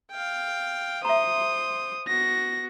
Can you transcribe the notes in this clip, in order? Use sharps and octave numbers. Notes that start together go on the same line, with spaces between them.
F5 G5
C5 E5 A#5 C6 D#6
B3 F#4 A#6